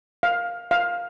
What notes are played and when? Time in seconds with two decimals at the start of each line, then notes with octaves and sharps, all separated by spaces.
0.23 F5
0.71 F5